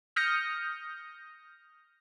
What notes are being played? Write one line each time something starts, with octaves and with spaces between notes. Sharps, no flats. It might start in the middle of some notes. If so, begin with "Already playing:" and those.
D#6 F6 G6 A#6 C#7